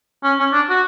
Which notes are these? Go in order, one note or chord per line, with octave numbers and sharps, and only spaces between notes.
C#4
C#4
D4
F#4